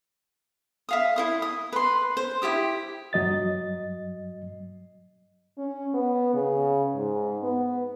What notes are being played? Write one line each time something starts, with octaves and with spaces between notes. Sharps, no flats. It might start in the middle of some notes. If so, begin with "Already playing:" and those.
E5 F5 D#6
E4 C5 D#6
D#6
B4 C6
C5
E4 F4 G4 D#6
G2 F#3 D#5 A6
C#4
B3
C#3
G#2
B3